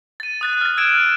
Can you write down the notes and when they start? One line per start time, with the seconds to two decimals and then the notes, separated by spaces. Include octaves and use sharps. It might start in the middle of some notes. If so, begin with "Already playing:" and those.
0.20 A6 D#7
0.41 D#6 F#6 A6
0.61 F6 A6
0.77 E6 G#6 D7 E7